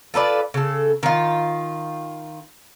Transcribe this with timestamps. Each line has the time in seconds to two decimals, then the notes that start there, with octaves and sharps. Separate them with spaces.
0.14 F4 A4 B4 D5
0.54 C#3 A4
1.03 D#3 F4